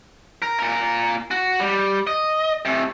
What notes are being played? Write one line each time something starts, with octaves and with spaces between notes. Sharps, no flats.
A#4
A#2 A#4
F#4
G3
D#5
C3 A3